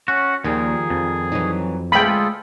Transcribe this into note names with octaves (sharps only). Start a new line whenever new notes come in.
C#4 F#4 F#5
D#2 D#3 F3 G3 G#4
F2
E3 F#3 D#4
D2 G#3 F4 G#4 A4 G5 B5